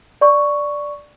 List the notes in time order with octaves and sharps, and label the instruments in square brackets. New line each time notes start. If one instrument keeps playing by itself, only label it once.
[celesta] D5 C#6